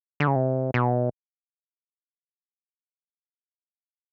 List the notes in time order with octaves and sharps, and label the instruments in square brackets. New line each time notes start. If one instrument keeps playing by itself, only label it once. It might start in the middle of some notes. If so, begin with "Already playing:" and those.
[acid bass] D3
C#3
C3
B2